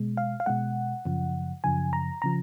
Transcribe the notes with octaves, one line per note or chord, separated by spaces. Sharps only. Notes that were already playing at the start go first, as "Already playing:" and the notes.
Already playing: B2 G#3
F5
F5
B2 G#3 F#5
F#2 C#3 F3
F#2 C#3 F3 G#5
A#5
C#3 F3 A#5